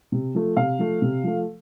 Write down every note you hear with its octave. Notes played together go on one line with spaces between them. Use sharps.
C3
F3 A3
C3 F5
F3 A3
C3
F3 A3